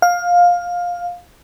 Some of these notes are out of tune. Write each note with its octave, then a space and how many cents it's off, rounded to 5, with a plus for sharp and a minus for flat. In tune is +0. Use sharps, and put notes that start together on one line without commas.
F5 +15